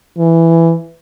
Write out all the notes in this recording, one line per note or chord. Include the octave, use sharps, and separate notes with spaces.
E3